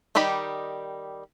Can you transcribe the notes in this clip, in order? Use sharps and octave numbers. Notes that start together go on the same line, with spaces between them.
D#3 G3 D#4 G4 B5